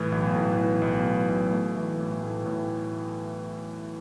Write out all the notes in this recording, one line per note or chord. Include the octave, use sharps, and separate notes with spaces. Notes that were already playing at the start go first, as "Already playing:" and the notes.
Already playing: A2 E3
B1
A2
E3
B1
A2
B1
A3
E3
A2
A2
A2